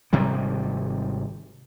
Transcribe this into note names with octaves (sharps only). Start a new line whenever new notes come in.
G#1 C3 D#3 G3